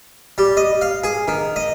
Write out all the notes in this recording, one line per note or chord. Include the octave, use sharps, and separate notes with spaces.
G3
D#5
F5
G#4
D#3
D#5